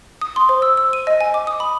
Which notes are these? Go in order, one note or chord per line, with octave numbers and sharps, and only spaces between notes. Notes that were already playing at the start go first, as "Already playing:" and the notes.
D#6
C6
C5
E6
E6
D#7
D#5
G#5
D6
D#6
B5